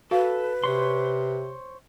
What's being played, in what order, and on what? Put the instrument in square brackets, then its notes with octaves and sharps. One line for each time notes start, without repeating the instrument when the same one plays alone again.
[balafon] F#4 F5 [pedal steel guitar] A4 [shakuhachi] B4
[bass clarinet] C3 [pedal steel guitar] C5 C#5 C6